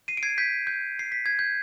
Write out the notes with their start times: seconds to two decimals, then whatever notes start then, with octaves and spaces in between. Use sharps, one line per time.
0.08 C7 D#7
0.17 D7
0.23 G#6 C7
0.38 G6 B6
0.67 G6
0.99 C7
1.12 B6
1.26 G#6
1.39 G6